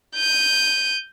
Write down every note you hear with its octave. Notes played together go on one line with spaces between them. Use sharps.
G6 D#7